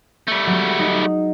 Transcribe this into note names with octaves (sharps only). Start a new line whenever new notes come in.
G3 A3
F#3 G#3
D#4 D#5